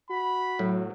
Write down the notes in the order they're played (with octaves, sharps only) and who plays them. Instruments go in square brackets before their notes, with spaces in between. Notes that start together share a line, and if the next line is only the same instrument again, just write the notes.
[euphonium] F#4 [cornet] B5
[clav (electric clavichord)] A2 [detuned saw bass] F#3